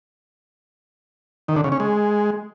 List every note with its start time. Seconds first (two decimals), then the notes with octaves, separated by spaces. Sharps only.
1.48 D#3
1.56 D3
1.64 C#3
1.72 C#4
1.80 G#3